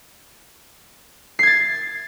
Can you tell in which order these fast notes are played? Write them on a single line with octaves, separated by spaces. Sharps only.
C7 G#6 A6